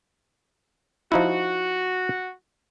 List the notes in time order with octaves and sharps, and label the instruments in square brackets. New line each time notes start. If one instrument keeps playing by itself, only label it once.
[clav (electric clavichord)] F3 D#4 E4 [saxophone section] F#4